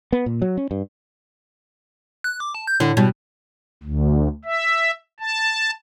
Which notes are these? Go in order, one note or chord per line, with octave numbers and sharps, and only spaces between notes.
B3
A#2
F#3
C#4
G2
F#6
D6
A5
G6
A2 D3
B2 G3
D2
E5
A5